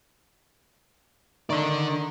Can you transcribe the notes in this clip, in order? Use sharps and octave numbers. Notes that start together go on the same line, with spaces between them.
D3 D#3 D5